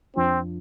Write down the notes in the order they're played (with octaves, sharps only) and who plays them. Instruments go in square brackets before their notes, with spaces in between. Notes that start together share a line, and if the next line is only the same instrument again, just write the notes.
[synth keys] F2 F3 D4 F4 [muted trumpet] C4